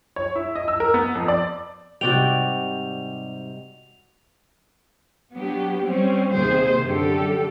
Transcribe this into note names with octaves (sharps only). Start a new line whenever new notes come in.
C#5
E4
D#5
E6
A#4
B3
F2
D5
G#2 C3 G3 F#4 D5 G5 F7
F#3 B3 D4 G4
G3 C4 C#4
D#2 C3 G#4 C5
F#2 D3 G4 A4